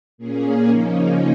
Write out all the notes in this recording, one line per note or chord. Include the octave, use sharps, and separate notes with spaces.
A#2 A#3 C#4 G#4
C#3 F3 A#3 C#4 D#4